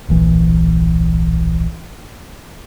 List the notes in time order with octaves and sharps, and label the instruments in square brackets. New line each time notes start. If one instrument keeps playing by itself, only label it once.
[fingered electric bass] D1 A#1 E3